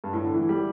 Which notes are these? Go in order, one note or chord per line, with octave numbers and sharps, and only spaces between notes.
G2
A2
D3
E3
G3